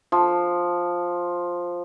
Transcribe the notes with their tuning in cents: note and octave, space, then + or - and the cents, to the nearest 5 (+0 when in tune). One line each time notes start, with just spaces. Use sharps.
F3 +5